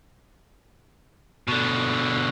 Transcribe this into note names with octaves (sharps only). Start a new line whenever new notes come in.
B2 D3